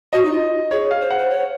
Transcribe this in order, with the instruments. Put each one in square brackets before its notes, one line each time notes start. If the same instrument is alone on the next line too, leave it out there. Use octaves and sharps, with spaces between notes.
[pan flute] F#4 [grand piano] D#5
[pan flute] D#4
F4
[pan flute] G#4 [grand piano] C#5
[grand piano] F5
[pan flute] C5
[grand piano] F#5
[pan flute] C5
C#5